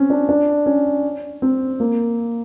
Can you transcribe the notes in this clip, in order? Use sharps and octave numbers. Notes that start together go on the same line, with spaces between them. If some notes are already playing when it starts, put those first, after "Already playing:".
Already playing: C4 C#4
D4
D4
C#4
C4
A#3